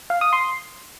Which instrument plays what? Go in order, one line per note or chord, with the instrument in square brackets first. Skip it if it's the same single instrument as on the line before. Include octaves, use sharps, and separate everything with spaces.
[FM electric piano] F5
D#6
C6